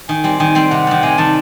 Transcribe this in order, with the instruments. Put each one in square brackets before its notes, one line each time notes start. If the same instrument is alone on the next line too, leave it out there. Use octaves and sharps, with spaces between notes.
[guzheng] D#3 [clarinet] G#5
[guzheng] G3 C4
[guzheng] D#3 [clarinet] G#5
[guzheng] G3 C4 [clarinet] G5
[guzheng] C3 [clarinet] F#5
[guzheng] D#3 G3
[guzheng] C3 [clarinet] G#5
[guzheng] D#3 G3 [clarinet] A5